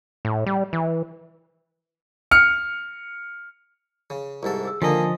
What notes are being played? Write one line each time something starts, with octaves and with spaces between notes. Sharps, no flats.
A2
G3
E3
F6 C#7
C#3
C2 G#2 A4
G#4 E6
D3 D#3 F3 A#3 F4 D#5 G#5 A5